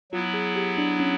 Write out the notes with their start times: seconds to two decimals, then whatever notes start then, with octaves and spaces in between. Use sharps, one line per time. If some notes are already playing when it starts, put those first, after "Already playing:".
0.12 F#3 B3 E4 F4
0.34 G#4
0.56 G4
0.78 D4
1.00 C#4